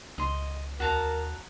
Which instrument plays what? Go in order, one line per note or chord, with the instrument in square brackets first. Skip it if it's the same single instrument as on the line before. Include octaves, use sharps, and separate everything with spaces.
[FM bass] C#2 [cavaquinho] D#5 C6
[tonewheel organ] D#2 [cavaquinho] F#4 A5 A#5 [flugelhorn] A#4